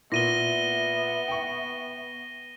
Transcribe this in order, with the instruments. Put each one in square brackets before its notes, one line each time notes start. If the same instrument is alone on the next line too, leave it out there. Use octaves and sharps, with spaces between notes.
[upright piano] A#2 [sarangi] B3 [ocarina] E5 [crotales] A#6 D#7 G7
[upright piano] G5 C#6